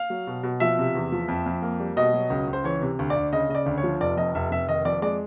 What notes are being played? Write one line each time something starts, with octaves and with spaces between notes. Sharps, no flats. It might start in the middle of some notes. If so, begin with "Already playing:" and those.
Already playing: F5
F#3
B2
B2
F3 E5
C3
E2
F3
F2
F2
A#3
G3
B2 D#5
F#3
C#2
C#2
C5
E3 C#5
C3
D2
D5
D2
C#3 D#5
C#3 D#5
D5
D2
C#5
F3
F1 D5
F2 D#5
F1 E5
F1 E5
D#3 D#5
F2 D5
G#3 D5